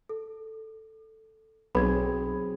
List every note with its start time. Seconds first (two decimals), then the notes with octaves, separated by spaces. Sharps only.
0.09 A4
1.75 B1 F#3 C4 G#4 B5 G#6